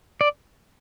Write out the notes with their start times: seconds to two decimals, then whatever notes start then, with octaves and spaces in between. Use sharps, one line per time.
0.21 D5